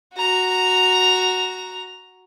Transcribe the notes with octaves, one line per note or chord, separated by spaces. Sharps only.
F#4 A#5